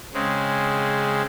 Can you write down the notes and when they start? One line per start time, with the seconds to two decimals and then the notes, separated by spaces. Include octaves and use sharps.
0.14 C#3 G#3 C4